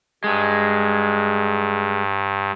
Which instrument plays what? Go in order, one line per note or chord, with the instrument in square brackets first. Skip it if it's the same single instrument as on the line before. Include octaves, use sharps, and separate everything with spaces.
[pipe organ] G2 [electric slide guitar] G#3